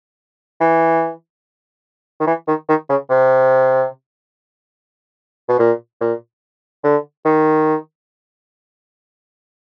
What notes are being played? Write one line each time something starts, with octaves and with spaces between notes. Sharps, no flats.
E3
D#3
E3
D#3
D#3
C#3
C3
B2
A#2
A#2
D3
D#3